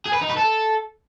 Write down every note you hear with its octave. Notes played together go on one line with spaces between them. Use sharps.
G#4
B4
D#4
B4
A4